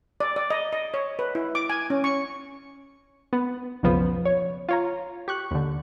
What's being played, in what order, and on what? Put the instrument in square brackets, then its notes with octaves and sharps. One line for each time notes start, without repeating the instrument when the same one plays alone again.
[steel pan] D5
D5
D#5
D#5
C#5
B4
E4
D6
G#5
C#4
C#6
[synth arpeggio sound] B3
B1 F2 C#3 F3 B3
C#5
F4 C#5 A#5
G4 C#6 F#6
D#2 D3